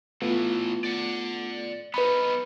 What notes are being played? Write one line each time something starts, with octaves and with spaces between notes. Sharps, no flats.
A2 E3 A3 B3 F4
D5 F#5
B3 D#4 B4 B5